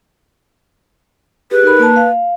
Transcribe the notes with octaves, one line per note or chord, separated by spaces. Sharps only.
G4 G#4 B4
D#4 A#4 B5
A#3 A5
F5